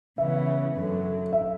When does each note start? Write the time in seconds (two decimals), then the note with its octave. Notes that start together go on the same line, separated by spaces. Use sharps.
0.18 C#3 E3 B3 E5
0.75 F#2 D3 F#3
1.33 E5